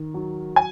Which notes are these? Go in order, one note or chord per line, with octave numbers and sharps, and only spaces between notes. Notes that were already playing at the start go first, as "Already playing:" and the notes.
Already playing: D#3
F#3
G#5